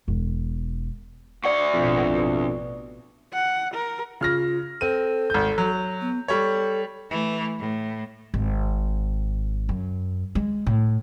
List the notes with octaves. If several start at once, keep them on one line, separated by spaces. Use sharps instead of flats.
E1
D2 D5 F#5 C#6
A1 F2 B2
F#5
A#4
C#3 F4 F6 A#6
C4 A4 D#7
G#1 G6
F#3
B3
G3 A4 C#5
E3 A3
A2
G#1
F#2
G#3
A2